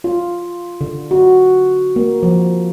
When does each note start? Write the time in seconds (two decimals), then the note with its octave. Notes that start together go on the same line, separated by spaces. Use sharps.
0.04 F4
0.81 D3
1.11 F#4
1.96 A#3
2.23 F3